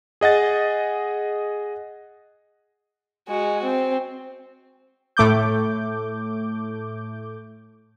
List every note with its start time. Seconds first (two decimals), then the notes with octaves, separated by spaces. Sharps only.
0.21 G#4 D#5 F#5 A6
3.28 G#3 F#4
3.63 C4
5.17 A2 A3 D6 G6